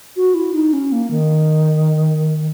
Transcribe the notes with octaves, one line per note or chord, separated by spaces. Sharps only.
F#4
E4
D#4
C#4
A#3
D#3